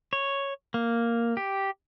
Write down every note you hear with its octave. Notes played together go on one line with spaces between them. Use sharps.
C#5
A#3
G4